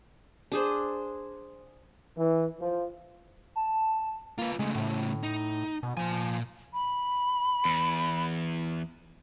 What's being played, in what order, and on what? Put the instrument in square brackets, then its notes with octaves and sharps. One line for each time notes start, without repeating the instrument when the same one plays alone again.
[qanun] D4 G#4 C5
[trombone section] E3
F3
[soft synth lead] A5
[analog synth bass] A#3 [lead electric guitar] F4 B4
[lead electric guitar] C#3 A3 [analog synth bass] G#3
[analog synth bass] A2
[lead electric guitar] D#4
[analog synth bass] B2
[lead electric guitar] A#2 G#5 [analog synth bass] F3
[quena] B5
[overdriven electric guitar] E2